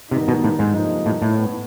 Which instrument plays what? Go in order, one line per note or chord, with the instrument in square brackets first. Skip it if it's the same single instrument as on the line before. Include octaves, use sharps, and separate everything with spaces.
[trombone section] G2 D#3 G3 B3 D#4 [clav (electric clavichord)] C3
[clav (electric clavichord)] B2
A2
G#2
[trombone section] F2 C3 F3 A#3 D#4
[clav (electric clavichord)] A2
A2
[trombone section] B3